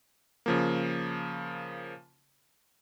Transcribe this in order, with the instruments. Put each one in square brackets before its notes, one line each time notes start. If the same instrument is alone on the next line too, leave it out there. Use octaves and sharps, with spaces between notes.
[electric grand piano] C#3 F3 A#3